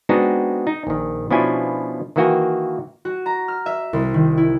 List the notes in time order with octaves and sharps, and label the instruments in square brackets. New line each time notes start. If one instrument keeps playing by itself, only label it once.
[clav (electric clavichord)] G#3 B3 C4 D4 D#4 F#4
D#4
A#1 D#3
B2 F3 C#4 D4 E4 G#5
D#3 E3 A#3 F#4 G5 G#5
[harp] F#4
A#5
F6
E5
C2
D#3
E4